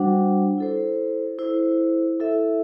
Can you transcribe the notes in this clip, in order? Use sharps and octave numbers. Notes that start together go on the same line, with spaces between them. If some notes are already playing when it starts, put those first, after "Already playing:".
Already playing: G3 D4 F#4 C5 F#5
E4 A4 C5
E4 A4 C5
E4 A4 E5